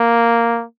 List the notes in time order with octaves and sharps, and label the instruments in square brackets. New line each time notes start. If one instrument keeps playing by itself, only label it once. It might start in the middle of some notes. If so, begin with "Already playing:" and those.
Already playing: [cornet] A#3